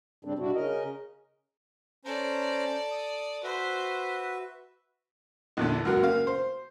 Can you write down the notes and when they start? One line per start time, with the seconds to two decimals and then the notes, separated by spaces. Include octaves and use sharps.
0.25 G2 C#3 G3 C4 D4
0.39 B2 G3 D4 E4 F#4
0.54 C#3 C#4 A#4 D#5
2.05 C#4 A4 C5 D5 A#5
2.91 D#6
3.43 F#4 B4 C5 E5
5.57 A#1 E2 D3
5.85 C#2 F#2 F#4 A#4
6.02 C#3 A#3 F5
6.27 C5